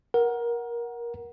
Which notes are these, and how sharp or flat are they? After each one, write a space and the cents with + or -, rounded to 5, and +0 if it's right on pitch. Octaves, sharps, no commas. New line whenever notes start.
A#4 +20 F#5 +0